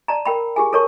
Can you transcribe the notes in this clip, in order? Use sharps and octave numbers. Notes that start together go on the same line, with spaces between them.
D5 A5 A#5
A#4 G5 B5
G4 G#4 G#5
A4 A#4 C#5 A5 C#6